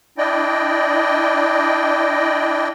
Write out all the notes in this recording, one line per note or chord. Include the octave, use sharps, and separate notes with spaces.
D4 E4 D5 D#5 G5